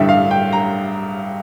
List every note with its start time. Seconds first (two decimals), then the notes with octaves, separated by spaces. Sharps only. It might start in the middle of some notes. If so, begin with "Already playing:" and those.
Already playing: A1 G2 D3 E5
0.09 F5
0.31 G5
0.52 A#5